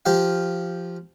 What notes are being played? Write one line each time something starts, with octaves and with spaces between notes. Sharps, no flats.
F3 G4 F5